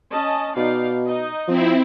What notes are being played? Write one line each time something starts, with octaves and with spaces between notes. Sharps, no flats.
C#4 D#5 A5
B2 D#4 D5 F5
D#4 D#5
F3 C4 E4